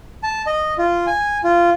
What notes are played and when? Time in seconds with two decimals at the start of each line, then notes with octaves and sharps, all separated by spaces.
0.23 A5
0.47 D#5
0.78 F4
1.07 G#5
1.44 F4